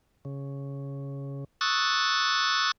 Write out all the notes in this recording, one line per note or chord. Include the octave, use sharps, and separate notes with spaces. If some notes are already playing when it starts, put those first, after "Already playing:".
C#3
C#6 D#6 E6 F#6 A6